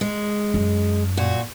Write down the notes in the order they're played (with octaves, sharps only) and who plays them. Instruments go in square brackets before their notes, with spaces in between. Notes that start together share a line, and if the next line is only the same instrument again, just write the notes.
[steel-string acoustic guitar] G#3
[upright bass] F#2
[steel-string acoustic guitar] A#2 F#4